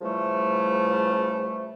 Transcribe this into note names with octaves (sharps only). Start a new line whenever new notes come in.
C#3 E3 F3 G3 A3